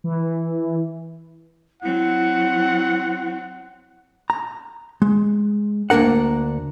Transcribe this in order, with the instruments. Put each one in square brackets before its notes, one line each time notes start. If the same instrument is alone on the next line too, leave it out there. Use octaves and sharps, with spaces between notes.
[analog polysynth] E3
[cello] F#3 C4 [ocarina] E4 [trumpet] F#5
[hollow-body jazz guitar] A#5
G#3
D2 A#3 D4 A#4 F#5